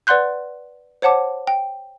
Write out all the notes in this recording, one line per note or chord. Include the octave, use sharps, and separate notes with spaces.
B4 D5 F#5 C6 F#6 G6
C5 C#5 F#5 A5 D6
G5